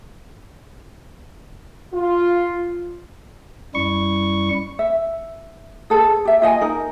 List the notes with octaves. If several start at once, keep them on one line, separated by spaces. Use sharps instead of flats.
F4
F#2 G3 E4 C#6
E5
G#4 A4 B4
G4 E5
F4 D#5 F#5 G#5
D#4 A#4